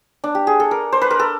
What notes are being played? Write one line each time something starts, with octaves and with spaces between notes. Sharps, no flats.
D4
G4
G#4
A4
A#4
C5
B4
A#4
A4